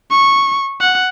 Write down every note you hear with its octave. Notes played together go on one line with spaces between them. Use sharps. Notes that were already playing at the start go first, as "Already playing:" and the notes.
C#6
F#5